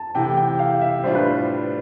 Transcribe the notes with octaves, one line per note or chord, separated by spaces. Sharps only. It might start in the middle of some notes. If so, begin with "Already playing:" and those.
Already playing: A5
C3 E3 A3 E4 G5
G5
F5
E5
A2 G3 D4 F4 C5
B4
C5